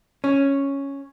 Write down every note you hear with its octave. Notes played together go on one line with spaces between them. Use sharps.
C#4